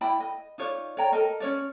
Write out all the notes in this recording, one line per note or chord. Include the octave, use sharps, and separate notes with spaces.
E4 D5 G5 B5
D#5
D#4 F4 C#5 D5
C#5 D5 G5 A#5
A4 A#4 D#5
C#4 C#5 D5